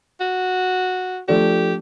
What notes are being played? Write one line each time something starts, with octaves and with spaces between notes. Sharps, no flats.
F#4
F3 A3 D4 G4